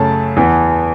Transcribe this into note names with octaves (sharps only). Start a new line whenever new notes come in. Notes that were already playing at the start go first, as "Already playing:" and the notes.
Already playing: F#2 C#3 A3 A5
E2 E3 B3